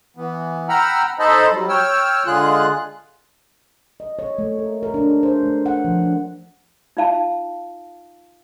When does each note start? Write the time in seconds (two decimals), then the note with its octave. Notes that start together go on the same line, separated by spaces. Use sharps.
0.17 E3 B3
0.69 F#5 G5 A#5 B5 E6 F6
1.19 D#4 A4 C5 D#5 A5 B5
1.52 F#3 G3
1.69 C#5 G5 E6 F6
2.26 D3 G#3 F4 G#4 F#6
4.00 D#5
4.19 C#5
4.38 A3
4.59 A#4
4.83 A#4
4.94 D4
5.09 G#4
5.23 C5
5.43 A3
5.66 F#5
5.85 F3
5.99 D4
6.97 D#4 F4 F5 A5